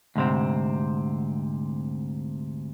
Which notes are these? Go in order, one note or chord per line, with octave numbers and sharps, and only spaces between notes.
D2 G#2 C3 C4